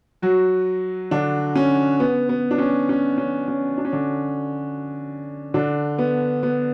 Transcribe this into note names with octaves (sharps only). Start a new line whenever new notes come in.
F#3 F#4
D3 D4
C#4
B3
B3
D4
C#4
C#4
C#4
C#4
D4
C#4
D3 D4
D3 D4
B3
B3